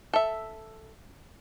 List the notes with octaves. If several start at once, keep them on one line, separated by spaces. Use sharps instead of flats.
A4 E5